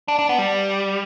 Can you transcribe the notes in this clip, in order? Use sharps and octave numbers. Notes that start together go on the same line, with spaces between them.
D4
D4
B3
G3